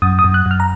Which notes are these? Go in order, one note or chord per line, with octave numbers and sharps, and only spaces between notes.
F#2 D#6
D#6
F#2
F#6
F#2 F6
A#5